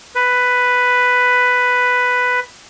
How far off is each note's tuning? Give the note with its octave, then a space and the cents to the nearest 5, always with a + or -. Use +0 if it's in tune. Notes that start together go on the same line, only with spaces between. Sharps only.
B4 +5